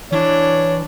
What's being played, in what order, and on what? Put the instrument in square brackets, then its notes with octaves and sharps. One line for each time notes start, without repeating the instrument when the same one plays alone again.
[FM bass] E3 [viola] D4 [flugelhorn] C#5